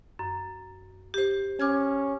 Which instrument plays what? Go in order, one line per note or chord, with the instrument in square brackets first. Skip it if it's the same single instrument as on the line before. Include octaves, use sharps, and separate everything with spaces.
[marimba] F#2
G4 C5
[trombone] C#4 [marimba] D6 F6 G#6